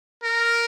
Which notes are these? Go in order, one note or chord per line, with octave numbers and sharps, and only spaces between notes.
A#4